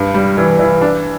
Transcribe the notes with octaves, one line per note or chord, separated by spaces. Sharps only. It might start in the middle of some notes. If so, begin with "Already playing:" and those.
Already playing: G2
G3
E3
E3
D4